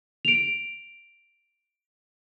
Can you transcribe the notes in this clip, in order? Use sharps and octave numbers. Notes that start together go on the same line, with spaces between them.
D7 F7